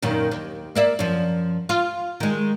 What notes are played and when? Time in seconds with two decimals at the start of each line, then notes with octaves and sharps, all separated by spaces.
0.02 F#2 A#2 D#3
0.31 D#2
0.75 A#3 D5 E5
0.99 F#2 F3
1.69 F4
2.20 D#3 G#3